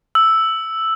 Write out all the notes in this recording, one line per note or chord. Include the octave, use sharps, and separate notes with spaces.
E6